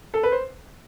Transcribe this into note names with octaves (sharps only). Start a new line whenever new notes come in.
A4
B4
C5